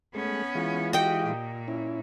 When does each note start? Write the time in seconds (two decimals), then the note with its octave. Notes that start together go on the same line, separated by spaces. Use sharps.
0.14 G#3 A3 B3 C#4
0.55 E3 G#3 F4
0.93 F#4 G4 D#5 G5
1.26 A#2
1.68 C#4 E4